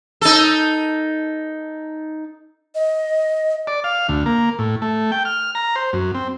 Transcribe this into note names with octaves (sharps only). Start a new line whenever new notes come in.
D#4 A4
D#5
D5
F5
D2
A#3
A2
A3
G5
F6
A#5
C5
F#2
C4